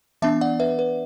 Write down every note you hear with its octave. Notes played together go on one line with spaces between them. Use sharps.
E3 B3 D4 E5 A5
D5 F#5
B4 E5
B4